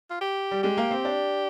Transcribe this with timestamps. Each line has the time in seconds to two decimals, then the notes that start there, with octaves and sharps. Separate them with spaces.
0.11 F4
0.21 G4
0.51 G3
0.63 G#3 G4
0.77 A#3
0.91 C4
1.05 D4